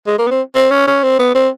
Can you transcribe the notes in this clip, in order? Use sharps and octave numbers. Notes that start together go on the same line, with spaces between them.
G#3
A#3
B3
C4
C4
C#4
C#4
C4
B3
C4